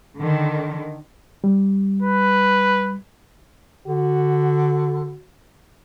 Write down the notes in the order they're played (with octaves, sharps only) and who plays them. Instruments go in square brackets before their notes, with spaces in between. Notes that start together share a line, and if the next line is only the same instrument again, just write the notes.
[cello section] D3 D#3
[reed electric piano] G3
[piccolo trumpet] B4
[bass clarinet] D3 [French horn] F#4